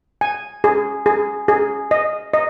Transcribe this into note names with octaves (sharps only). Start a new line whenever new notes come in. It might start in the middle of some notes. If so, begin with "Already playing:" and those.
G#5
G#4
G#4
G#4
D#5
D#5